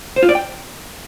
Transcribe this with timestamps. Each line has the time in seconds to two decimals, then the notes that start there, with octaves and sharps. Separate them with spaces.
0.16 C5
0.23 F4
0.29 D5
0.35 G5